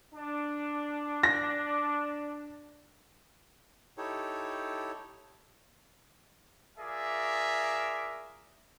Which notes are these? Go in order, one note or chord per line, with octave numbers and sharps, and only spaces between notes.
D4
A#6
D#4 E4 G4 A4 C#5
F4 G#4 A#4 D5 E5